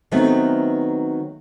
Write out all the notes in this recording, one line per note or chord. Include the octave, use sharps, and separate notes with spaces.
D#3 F#3 A3 B3 C4